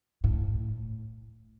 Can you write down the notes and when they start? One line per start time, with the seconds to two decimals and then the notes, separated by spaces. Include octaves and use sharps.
0.24 A2